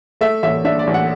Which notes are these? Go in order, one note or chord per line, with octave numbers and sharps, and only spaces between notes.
A3 E5
A1 E5
D4 E5
D5
A1
F#5